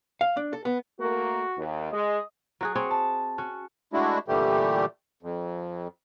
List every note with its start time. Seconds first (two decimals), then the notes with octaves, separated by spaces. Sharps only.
0.21 F5
0.37 D4
0.53 A4
0.65 B3
1.00 A3 A#3 F#4
1.58 D#2
1.92 G#3 D#5
2.61 F#3 F#4 G#4
2.75 C4 G#4 C#5
2.91 A5
3.38 C#4 F#4
3.93 G#3 A3 D4 E4 F#4
4.28 A#2 D3 E3 G3 A3 G4
5.23 F2